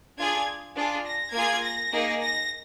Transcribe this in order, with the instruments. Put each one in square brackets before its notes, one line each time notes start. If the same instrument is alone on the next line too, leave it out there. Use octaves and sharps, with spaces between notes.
[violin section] D4 F4 G#4 G#6
D4 F4 G#4
A#6
A#3 F4 G#4 G#6
A#6
A#3 D#4 G#4
A#6